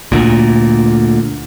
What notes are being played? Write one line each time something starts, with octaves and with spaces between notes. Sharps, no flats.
D2 A#2